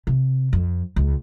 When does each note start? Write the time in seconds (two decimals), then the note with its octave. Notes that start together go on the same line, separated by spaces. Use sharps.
0.07 C3
0.53 F2
0.96 C#2